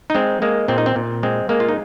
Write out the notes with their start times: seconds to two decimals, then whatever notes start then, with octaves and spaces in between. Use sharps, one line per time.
0.10 D#4
0.15 G#3 C4
0.42 G#3 A#3
0.68 A#2 C4
0.78 D#4
0.86 C4
0.96 A#2
1.23 G#3 C4
1.49 G#3 A#3
1.60 F4
1.69 D#4